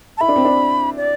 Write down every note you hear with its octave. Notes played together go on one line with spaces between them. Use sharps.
A5
E4 B5
D4
C4
D4
D5